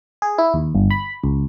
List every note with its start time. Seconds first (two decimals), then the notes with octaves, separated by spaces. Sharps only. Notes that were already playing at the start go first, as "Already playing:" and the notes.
0.22 G#4
0.38 E4
0.54 D#2
0.75 G1
0.91 B5
1.24 C#2